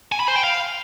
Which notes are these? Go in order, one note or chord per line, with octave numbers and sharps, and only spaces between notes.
G#5
B5
C5
G5
F5